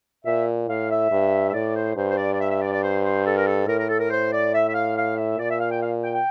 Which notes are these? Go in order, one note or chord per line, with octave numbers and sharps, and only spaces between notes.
A#2 E5
A2 F5
E5
G2
E5
A2 D5
C5
G2 C5
C5
D5
D5
E5
E5
D5
D5
C5
C5
A4
A#4
A4
A2 A#4
A#4
A4
A#4
C5
D5
E5
E5
F5
F5
E5
A#2 D5
E5
F5
G5
F5
G5
G5